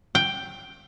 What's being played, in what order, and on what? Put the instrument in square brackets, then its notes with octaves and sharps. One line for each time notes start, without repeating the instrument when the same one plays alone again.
[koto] G5